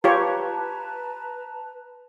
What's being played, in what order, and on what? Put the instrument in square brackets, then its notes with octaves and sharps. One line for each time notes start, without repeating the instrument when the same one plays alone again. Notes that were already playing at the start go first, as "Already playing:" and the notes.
[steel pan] F4 G4 C#5 [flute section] B4 A5 A#5